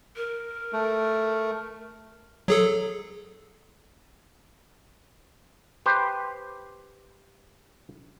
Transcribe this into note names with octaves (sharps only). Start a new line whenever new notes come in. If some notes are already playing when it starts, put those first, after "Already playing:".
A#4
A3
F#3 G#4 A4
G4 B4 C5